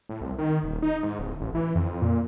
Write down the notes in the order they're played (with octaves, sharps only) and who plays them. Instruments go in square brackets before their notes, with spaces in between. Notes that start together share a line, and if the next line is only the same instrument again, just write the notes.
[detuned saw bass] A2
C2
D#3
D#1
D#4
G#2
D1
A1
E3
F2
A#2